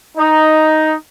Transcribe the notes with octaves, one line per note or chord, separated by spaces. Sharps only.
D#4